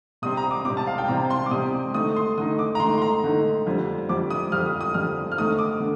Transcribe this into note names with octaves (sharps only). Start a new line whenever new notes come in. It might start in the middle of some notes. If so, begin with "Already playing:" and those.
C3 G3 C4 D#6
A#5
D6
C3 G3 C4 D6
A5
F5
G5
C3 G3 C4 A#5
C6
D6
C3 G3 C4 D#6
D3 A3 D#4 D#6
C6
D3 A3 D#4 D#6
D6
A#5
D3 A3 D#4 C6
C6
A#5
D3 A3 D#4
F2 D3 G3
F2 D3 G3 D6
D#6
F2 D3 G3 F6
D#6
D#6
F2 D3 G3 F6
F6
D3 A3 D#4 D#6
D6
D3